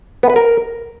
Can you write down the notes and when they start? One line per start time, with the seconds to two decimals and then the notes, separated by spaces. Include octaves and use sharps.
0.23 B3
0.30 B4
0.36 A#4